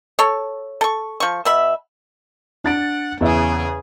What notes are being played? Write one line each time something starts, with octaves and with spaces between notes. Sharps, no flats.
A4 C#5
A4 C#6
F3 C#6
B2 E5 B5
D4 F#5 A6 D7
E2 C#3 G#4 E5